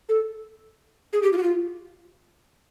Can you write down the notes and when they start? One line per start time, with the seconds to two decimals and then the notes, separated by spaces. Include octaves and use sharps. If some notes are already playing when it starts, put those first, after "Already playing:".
0.09 A4
1.13 G#4
1.23 G4
1.33 F4
1.37 F#4
1.43 F4